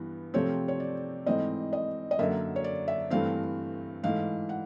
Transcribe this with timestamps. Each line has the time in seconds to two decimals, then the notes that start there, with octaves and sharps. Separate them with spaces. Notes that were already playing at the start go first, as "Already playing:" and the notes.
Already playing: G2 E3 B3
0.34 C3 F3 A3 C4 C#5
0.68 C#5
0.80 D5
1.26 G#2 E3 A3 C4 D#5
1.73 D#5
2.11 D#5
2.19 F#2 D3 F#3 A#3 E5
2.56 C#5
2.64 D5
2.88 E5
3.10 G2 E3 A3 C4 F5
4.04 G#2 E3 A3 F5
4.49 F#5